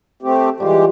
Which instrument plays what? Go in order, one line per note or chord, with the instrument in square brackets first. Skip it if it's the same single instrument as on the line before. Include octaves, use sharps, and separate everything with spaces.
[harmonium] A3 C4 G4
[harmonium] E3 G#3 G4 [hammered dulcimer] G3 F4